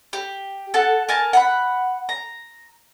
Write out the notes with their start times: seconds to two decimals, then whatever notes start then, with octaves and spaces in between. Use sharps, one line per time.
0.13 G4
0.74 A4 F#5 A5
1.09 A#4 G#5 A5
1.33 F#5 A#5 B5
2.09 A#5